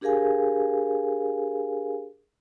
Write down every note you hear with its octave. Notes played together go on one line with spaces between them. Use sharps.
D4 G4 G#4 A#4 F5 G#5